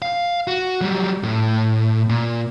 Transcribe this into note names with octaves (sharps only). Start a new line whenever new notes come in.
F5
F#4
F#3 G3
A2
A#2